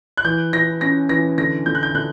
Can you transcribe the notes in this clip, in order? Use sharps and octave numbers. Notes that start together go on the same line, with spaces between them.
F#6
E3 G6
E3 A#6
C#4 A#6
E3 A#6
D3 A#6
D3 G6
F#6
G6
D3 F#6